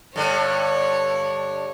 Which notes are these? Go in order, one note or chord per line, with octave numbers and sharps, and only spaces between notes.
G2 D3 C#5